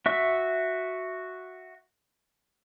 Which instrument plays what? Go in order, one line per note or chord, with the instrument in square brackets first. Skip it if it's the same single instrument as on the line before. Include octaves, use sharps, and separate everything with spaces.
[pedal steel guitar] F#4 E5 C#6